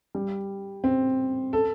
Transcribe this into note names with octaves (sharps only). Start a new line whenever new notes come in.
G3
C4
A4